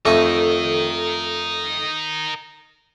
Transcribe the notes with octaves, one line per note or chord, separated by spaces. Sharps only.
F2 A3 A#4 D#5 C#6